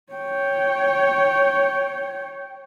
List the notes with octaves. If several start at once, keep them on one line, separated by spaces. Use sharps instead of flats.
C#5 G5